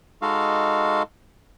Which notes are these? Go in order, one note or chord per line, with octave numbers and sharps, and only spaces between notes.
G#3 D#4 F#4 A4 F5